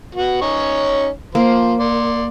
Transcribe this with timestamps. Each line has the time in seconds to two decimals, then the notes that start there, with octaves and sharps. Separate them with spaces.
0.15 B3 F#4
0.41 C#4 D#4 C#5
1.35 F3 A#3 C5
1.80 D5 C6